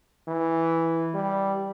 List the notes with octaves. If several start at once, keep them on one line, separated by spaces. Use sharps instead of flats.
E3
G3